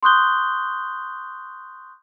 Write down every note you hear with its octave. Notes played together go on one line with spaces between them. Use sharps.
C6 C#6 D#6 F#6 G6 G7